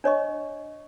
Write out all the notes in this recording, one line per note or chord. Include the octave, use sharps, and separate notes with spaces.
D4 C#5 D#5 C#6